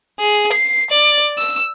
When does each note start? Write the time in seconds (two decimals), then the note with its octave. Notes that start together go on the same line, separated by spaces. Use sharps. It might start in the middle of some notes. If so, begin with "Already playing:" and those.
0.20 G#4
0.53 C7
0.90 D5
1.38 E6